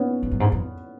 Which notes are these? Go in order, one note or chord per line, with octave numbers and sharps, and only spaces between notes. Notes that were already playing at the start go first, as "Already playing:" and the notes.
Already playing: B3 C#4
G#2
F#2
G#2
F2